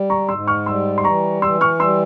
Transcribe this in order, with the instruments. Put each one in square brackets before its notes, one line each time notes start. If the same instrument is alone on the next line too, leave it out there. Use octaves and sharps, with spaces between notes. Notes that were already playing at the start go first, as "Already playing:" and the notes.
Already playing: [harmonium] G3
[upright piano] A#5 C#6
[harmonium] G#2 [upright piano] C6 E6
[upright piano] C#6 F6
[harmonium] G3 [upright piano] C6 E6
[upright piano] C6
[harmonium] E3 [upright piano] A#5 C#6
[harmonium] E3 [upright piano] C6 E6
[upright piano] C#6 F6
[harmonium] G3 [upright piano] C6 E6